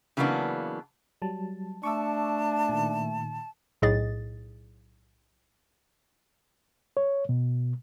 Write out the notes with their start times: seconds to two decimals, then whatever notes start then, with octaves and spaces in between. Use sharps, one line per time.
0.17 C#3 E3 F#3 A#3 B3 D4
1.22 F#3 G3 A5
1.83 A3 D4 A5 C#6 D6 E6
2.69 A#2 D#3
3.82 B1 A2 G#4 D#5 A6
6.97 C#5
7.29 B2